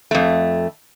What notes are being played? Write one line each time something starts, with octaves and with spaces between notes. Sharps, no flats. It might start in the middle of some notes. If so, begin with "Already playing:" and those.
F2 A3